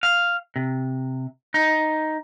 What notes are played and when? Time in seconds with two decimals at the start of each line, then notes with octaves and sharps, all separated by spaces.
0.03 F5
0.56 C3
1.54 D#4